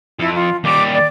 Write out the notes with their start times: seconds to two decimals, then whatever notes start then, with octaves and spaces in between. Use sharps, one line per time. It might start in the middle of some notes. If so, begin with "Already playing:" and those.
0.20 F2 E4
0.34 F4
0.64 D#2 G3 D6
0.93 D5